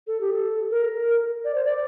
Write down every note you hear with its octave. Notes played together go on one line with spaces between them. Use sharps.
A4
G4
A4
A#4
D5
C5
D5